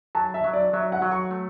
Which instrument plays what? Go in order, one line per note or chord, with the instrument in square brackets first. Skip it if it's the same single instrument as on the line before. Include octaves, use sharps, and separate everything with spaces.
[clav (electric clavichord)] F#3 [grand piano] A5
[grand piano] E5
[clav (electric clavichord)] F#3
[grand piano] D5
[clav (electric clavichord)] F#3 [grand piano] E5
[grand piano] F#5
[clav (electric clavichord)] F#3
[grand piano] C#6
[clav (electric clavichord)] A3